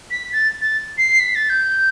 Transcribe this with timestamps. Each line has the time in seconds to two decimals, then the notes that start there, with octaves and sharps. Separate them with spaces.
0.10 B6
0.32 A6
0.61 A6
0.98 C7
1.20 B6
1.35 A6
1.50 G6